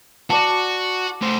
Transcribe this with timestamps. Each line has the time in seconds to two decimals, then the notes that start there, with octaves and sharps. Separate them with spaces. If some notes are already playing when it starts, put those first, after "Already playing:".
0.30 F#4 D5 A5
1.22 A3 C5